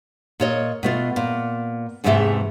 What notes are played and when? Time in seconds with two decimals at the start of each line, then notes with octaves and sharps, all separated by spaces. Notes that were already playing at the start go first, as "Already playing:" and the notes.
0.40 A#2 C#5 D#5
0.83 B2 A3 F4
1.16 A#2
2.04 E2 G#2 C3 E3 A3 E5